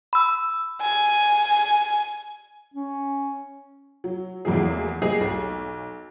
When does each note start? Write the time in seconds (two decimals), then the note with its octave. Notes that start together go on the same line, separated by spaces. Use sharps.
0.13 B5 E6
0.81 G#5
2.74 C#4
4.04 F#3
4.45 F1 E2 F#3 A#3 E4 G#4
5.02 G3 A#3 G4 G#4 D#5
5.20 B1